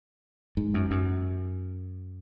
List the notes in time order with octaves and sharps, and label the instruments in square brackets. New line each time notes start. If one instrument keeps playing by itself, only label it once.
[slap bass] G#2
F#2
F#2